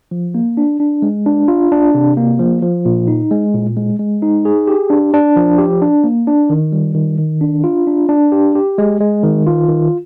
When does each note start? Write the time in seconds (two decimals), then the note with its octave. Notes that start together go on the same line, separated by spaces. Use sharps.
0.11 F3
0.35 A#3
0.57 D4
0.80 D4
1.02 G#3
1.26 D4
1.48 F4
1.72 D4
1.94 C3
2.17 A#3
2.39 F3
2.62 F3
2.85 A#2
3.08 D#4
3.31 G#3
3.54 A#2
3.77 G#3
3.99 G#3
4.22 D#4
4.45 G#4
4.67 G4
4.90 D4
5.14 D4
5.36 F3
5.58 G4
5.82 D4
6.04 A#3
6.27 D4
6.50 D#3
6.72 G3
6.95 D#3
7.19 D#3
7.41 D4
7.64 F4
7.87 D4
8.09 D4
8.32 G4
8.55 G4
8.78 G#3
9.00 G#3
9.23 D#3
9.47 F4
9.68 D#3